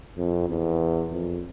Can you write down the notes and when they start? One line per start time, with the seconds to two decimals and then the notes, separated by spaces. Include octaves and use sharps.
0.18 F2
0.49 E2
1.11 F2